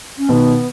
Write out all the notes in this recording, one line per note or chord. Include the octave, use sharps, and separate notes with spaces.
C#4
B2 D#3 B3